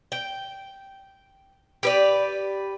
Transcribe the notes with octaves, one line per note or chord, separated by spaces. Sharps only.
G5
G4 B4 D5